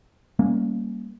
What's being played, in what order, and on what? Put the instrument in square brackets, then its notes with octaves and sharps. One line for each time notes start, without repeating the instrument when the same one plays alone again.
[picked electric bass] G3 A#3 C#4